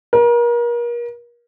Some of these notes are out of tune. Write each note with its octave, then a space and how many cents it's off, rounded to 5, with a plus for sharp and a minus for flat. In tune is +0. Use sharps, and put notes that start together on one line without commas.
A#4 +35